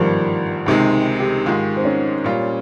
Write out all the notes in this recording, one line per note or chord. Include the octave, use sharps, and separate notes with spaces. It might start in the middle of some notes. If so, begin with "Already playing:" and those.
Already playing: G#1 G2 D#3 F3 G3 A#3
C#2 C3 D#3 G#3 D#4
D#4
G4
G#2 D#3 G#3 F4
C4
C#4
A#2 G3 C#4 F4